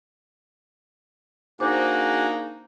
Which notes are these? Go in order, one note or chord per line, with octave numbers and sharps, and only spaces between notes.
A#3 D4 D#4 F#4 G#4 C5 D6